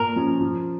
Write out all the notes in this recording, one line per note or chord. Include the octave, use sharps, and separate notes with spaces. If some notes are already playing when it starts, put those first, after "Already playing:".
Already playing: A#2 A#4
F3 C#4
F3